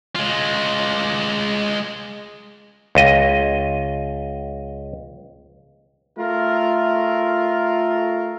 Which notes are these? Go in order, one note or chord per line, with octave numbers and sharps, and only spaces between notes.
G#3 F4
C#2 D#5
A3 F4 A#4